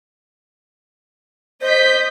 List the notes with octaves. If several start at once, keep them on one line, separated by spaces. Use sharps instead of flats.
C5 D#5 G6 B6